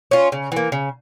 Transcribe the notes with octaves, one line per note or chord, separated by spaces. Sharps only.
C#4 F4
C#3
E3 A#3
C#3